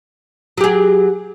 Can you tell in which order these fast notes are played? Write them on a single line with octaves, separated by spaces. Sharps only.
F#3 G4 G#4